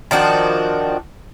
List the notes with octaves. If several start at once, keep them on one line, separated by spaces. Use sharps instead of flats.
D#3 F3 D4 F#4